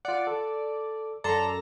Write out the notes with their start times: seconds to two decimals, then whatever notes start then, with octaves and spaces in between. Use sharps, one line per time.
0.05 F4 D5 F#5
0.27 A4
1.24 F#2 A4 D5 A5 A#5 C6